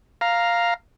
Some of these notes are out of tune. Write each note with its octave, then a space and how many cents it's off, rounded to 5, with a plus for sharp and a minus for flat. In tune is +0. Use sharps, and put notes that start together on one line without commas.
F5 +0 A#5 +0